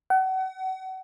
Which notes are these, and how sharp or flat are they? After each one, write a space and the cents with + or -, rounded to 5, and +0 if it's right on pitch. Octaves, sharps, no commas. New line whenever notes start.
F#5 +35